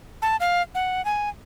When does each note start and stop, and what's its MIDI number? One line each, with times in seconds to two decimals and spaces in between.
0.22 0.36 81
0.40 0.62 77
0.75 1.04 78
1.05 1.29 80